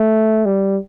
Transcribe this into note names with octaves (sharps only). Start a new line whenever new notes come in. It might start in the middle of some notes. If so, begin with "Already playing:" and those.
Already playing: A3
G3